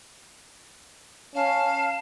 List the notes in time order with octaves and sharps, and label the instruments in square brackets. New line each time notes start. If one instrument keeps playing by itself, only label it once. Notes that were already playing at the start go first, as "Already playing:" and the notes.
[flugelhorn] C#4 [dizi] F5 [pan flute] A5